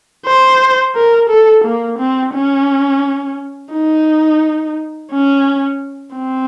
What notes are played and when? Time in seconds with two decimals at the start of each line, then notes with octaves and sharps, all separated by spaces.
0.26 C5
0.95 A#4
1.30 A4
1.65 A#3
1.98 C4
2.34 C#4
3.72 D#4
5.11 C#4
6.15 C4